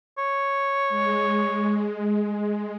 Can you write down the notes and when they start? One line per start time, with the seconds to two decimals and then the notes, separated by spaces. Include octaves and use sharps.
0.18 C#5
0.89 G#3